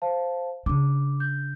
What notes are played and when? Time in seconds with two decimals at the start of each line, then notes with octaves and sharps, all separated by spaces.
0.02 C5 F5 A5
0.66 C#3 D4 D6
1.20 G6